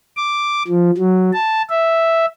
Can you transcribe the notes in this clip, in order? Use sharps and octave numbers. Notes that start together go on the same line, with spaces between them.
D6
F3
F#3
A5
E5